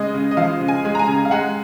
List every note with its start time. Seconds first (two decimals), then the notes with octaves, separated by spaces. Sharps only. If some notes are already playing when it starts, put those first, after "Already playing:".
Already playing: C#3 G#3 D#5
0.14 C#3
0.31 D#5
0.37 F3 F5
0.61 C#3
0.68 G#5
0.85 G#3
0.95 A#5
0.99 G#5
1.07 C#3
1.25 F5
1.31 G#3 F#5